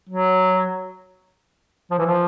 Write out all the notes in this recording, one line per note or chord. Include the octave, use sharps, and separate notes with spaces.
F#3
F3
E3
F3